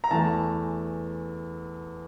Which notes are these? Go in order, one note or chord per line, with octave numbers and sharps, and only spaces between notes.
A#5
E2 E3 A3 A5